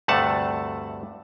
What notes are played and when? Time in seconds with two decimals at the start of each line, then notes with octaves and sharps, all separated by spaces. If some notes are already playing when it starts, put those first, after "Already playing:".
0.08 D2 G2 C3 A3 F#5 A5